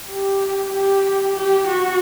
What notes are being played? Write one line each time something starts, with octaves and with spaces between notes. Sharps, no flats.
G4
G4
G4
F#4